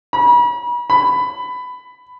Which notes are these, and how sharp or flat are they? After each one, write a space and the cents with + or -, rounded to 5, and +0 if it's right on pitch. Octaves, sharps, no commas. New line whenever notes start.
B5 -40
B5 +15